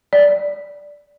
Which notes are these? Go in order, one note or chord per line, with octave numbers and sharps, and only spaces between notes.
D5